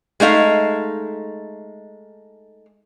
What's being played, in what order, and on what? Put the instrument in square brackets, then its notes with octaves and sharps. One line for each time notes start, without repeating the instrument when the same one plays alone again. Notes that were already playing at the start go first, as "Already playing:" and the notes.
[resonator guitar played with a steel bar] G#3 A3 D#4 F5